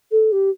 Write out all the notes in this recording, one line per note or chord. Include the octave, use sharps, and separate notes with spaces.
A4
G4